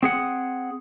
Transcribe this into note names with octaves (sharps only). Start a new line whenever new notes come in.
C4 G#4 F#5